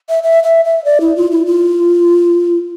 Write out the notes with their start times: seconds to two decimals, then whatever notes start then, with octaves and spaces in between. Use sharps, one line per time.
0.09 E5
0.23 E5
0.44 E5
0.65 E5
0.85 D5
1.01 E4
1.16 F4
1.31 E4
1.46 F4